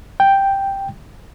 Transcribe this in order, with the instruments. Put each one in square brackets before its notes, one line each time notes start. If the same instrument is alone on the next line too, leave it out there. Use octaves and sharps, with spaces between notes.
[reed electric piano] G5